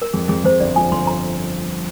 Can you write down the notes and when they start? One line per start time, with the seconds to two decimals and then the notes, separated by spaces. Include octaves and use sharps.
0.02 A#4
0.13 F2 G#4
0.29 F2 G#4
0.44 F2 C5
0.60 G1 D5
0.76 F3 G#5
0.92 G1 C6
1.07 A#5